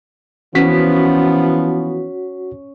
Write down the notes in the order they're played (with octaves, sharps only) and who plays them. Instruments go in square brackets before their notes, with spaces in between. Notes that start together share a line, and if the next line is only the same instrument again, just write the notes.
[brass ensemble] E3 F3 B3 [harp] C#4 [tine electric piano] F#4 B6